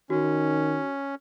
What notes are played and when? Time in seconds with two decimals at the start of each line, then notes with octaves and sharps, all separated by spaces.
0.10 D#3 C#4 F#4